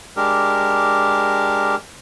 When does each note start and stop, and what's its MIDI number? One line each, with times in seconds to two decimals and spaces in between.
0.17 1.76 56
0.17 1.76 62
0.17 1.76 67
0.17 1.76 70